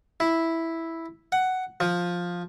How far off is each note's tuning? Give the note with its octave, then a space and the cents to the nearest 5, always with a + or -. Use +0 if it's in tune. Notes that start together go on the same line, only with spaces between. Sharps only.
E4 -5
F#5 +10
F3 +10